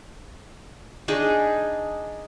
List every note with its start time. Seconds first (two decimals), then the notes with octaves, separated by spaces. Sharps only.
1.08 D4 D#4 G#4 D#5